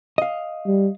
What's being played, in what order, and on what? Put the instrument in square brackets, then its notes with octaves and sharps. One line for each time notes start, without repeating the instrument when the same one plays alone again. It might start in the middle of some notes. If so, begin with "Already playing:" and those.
[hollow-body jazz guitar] D#5 F5
[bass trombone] G3